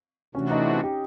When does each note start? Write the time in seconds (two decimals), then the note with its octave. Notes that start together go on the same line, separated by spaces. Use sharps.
0.35 C3 E3 A3 C#4 D4 F#4
0.51 D#4
0.83 G4